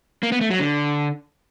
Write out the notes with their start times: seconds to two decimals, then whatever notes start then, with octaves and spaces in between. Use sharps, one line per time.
0.23 A#3
0.32 B3
0.41 A3
0.50 F#3
0.59 D3